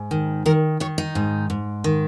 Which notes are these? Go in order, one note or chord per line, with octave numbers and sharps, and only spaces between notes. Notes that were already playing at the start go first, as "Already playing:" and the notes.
Already playing: G#2
D#3
D#3 A#4
D#3 C#5
D#4
G#2
G#2
D#3